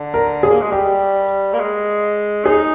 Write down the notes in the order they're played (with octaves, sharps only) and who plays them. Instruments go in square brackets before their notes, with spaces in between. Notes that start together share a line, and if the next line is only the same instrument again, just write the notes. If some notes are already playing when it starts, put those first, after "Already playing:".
Already playing: [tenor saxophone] D3
[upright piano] A#4
G#4
[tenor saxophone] A#3
G#3
[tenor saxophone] G3 [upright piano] G4
[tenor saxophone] A#3
G#3
[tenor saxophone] D#4 [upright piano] G#4